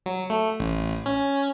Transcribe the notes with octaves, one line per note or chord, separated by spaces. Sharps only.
F#3
A3
A1
C#4